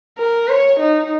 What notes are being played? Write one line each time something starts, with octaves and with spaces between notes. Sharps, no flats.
A#4
C#5
D#4